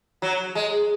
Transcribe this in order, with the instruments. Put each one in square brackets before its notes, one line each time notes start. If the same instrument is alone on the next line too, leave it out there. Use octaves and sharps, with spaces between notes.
[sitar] F#3
G#3